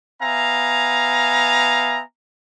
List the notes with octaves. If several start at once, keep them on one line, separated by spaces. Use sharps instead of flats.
B3 E5 F5 G#5 A#5